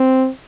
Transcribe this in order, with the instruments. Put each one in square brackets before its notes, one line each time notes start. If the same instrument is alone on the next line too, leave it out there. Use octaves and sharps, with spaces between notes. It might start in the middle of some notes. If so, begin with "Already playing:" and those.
Already playing: [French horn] C4